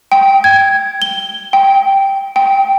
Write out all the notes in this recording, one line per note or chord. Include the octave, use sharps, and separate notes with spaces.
G5
G#6
G7
G5
G5